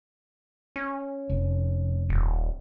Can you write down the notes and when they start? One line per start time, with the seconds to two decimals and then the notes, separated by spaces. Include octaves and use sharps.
0.76 C#4
1.30 F1
2.09 D#1